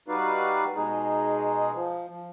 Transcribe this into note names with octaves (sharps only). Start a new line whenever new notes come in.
G3 D#4 F#4 B4 D5 F5
B2 G#3 D#4 G#4
F3
F3